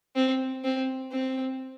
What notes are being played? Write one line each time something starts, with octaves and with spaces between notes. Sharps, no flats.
C4
C4
C4